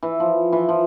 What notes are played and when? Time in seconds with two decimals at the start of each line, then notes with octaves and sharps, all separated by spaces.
0.03 E3
0.20 F3
0.52 E3
0.69 F3